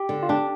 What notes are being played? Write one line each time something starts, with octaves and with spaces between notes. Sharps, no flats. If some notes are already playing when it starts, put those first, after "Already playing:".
Already playing: G4
D3
F4
D4 G4